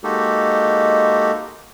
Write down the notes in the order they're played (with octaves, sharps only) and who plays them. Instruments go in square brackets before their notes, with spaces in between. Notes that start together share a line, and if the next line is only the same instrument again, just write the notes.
[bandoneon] G#3 A#3 D#4 F#4 G4 A4